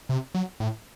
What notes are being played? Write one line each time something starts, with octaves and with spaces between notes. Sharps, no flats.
C3
F#3
A2